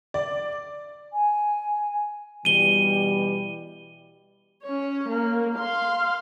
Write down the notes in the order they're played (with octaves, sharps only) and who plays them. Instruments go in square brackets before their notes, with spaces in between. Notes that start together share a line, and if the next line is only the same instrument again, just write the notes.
[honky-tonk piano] D5
[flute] G#5
[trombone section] B2 E3 G3 [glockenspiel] D#7 G7
[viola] C#4 C#5
A#3
F5 C6